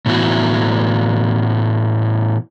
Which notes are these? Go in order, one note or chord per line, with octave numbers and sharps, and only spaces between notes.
A2 E3 B3 E4 F#4